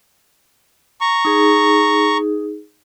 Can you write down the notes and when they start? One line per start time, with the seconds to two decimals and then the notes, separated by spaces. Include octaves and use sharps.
1.01 A#5 C#6
1.25 D#4 G#4